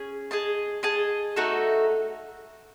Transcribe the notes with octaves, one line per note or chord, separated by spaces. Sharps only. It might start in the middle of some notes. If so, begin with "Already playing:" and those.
Already playing: C#4 G#4
G#4 D#5 A5
G#4 D#5 A5
A3 D#4 F#4 A4